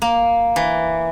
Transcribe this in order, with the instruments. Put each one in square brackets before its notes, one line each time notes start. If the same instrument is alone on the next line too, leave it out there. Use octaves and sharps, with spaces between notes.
[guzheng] A#3
E3